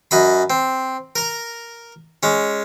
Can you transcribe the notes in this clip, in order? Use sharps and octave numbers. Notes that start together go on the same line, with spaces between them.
F#2 D#5 B5
C4
A#4 A#5
G#3 C#4